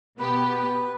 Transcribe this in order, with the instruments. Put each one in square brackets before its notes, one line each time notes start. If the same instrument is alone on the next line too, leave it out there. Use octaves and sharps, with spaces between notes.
[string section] B2 B3 G4 [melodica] B4